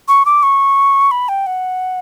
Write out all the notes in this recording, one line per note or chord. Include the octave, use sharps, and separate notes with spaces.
C#6
D6
C#6
B5
G5
F#5